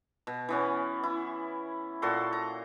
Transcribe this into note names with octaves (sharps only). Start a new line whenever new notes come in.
B2
E3 B3 C#4
E4
A#2 F#4 A4 C6
A#5